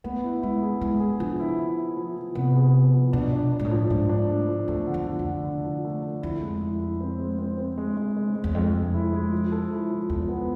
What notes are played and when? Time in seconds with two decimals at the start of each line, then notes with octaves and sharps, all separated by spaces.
0.04 A3 B3
0.24 E4
0.42 G#3 E4
0.62 G#4
0.81 G#3 E4
1.00 G#4
1.19 D3 F3
1.40 E4
1.59 E4
1.78 E4
1.97 F3
2.17 F3
2.35 C3 B3
2.55 G#4
2.75 B3
2.94 F3
3.13 B2 D4
3.33 D4
3.52 D4
3.59 G#2
3.65 A2
3.71 F3
3.90 G#2 D4
4.09 D4
4.29 A3
4.49 F3
4.68 E2 A3
4.87 D3
4.94 E2
5.07 F3
5.19 F2
5.26 D3
5.45 D3
5.65 F3
5.85 A3
6.03 A3
6.22 F2 E4
6.43 G#3
6.62 E4
6.80 E4
7.00 C4
7.19 G#3
7.38 C4
7.58 C4
7.78 G#3
7.97 G#3
8.17 G#3
8.35 G#3
8.44 E2
8.54 F2 G#3
8.74 G#3
8.94 E4
9.12 G#3
9.32 F3
9.52 A4
9.71 E4
9.90 F3
10.10 E2 F3
10.29 B3